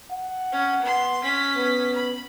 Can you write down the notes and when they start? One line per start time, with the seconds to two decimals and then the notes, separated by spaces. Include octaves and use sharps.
0.12 F#5
0.52 C#4
0.82 B3 C6
1.23 C#4 B6
1.57 B3
1.95 B5